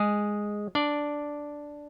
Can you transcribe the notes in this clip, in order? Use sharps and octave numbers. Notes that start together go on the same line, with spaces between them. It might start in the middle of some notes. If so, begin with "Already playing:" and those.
Already playing: G#3 G#4
D4 D5